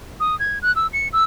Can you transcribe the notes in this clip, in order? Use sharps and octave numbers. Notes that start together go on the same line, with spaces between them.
D#6
G#6
F#6
E6
C#7
E6